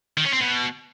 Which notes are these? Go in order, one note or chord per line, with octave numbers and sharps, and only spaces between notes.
D#3
C#4
C4
B2